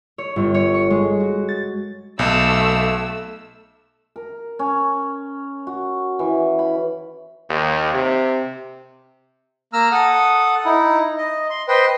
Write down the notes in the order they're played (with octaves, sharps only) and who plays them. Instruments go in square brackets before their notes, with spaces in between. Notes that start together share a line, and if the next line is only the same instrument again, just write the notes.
[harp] C#5
G1
C#5
C#6
G#3
F#4
A6
[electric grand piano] B1 [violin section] A3 E6
[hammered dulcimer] A#4
C#4
F#4
E3
B5
[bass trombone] D#2
C3
[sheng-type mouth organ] A#3 A#5 E6 F6
A4 F#5 D#6
D#4 E4
D#5
C6
B4 C5 D#5 G5 C6